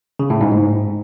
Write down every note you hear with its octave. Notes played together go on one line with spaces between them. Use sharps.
C#3
A2
G#2
G#2